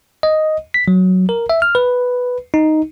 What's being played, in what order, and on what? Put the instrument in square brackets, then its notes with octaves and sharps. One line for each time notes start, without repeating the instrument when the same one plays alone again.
[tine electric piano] D#5
B6
F#3
A#4
E5
F6
B4
D#4